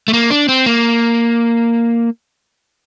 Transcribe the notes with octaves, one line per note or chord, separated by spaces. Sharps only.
A3
A#3
D4
C4
A#3